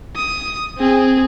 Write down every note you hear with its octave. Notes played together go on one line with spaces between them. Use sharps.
D#6
C4 G#4